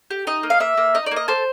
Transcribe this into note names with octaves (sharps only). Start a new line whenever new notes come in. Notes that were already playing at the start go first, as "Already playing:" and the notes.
G4
D#4 D#5
A#3
F5
A#3 E5
A#3
D#4 D#5
D5
A#3
D#5
A4 C5